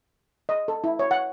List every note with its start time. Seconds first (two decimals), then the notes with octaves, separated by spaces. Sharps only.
0.49 D#5
0.68 A4
0.84 E4
0.99 C#5
1.11 F#5